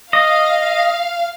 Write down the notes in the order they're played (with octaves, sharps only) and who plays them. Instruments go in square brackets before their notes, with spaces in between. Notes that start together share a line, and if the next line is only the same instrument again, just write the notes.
[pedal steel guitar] D#5 [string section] F5